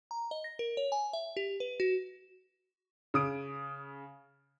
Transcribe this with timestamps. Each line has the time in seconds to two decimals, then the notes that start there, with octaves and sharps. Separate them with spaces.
0.11 A#5
0.31 D#5
0.44 A#6
0.59 A#4
0.77 C#5
0.92 G#5
1.13 E5
1.37 G4
1.60 B4
1.80 F#4
3.14 C#3 D#6 D7